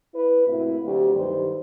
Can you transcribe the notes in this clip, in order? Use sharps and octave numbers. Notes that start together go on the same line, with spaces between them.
E4 B4
A2 C3 A#3 C4 E4 F#4
D2 F#3 F#4 G4
G2 D#3 C5